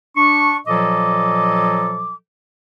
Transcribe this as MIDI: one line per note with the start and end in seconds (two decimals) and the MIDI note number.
0.17 0.57 62
0.17 0.57 85
0.67 2.14 46
0.67 2.14 53
0.67 2.14 54
0.67 2.14 69
0.67 2.14 75
0.67 2.14 86